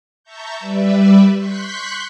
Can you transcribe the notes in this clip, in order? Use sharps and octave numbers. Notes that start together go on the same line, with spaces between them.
E5 A5 A#5 C#6 G6
G3 B4 D5 E5
C6 C#6 F#6 G6 B6